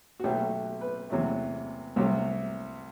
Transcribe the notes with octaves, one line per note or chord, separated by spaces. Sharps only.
F#4
B1 B2 F#3 A3 G4
B4
E2 C3 F#3 A3
C2 C3 F#3 A3